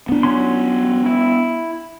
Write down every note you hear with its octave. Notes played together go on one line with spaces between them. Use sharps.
B3 D4
F#3 C#4 C6
E4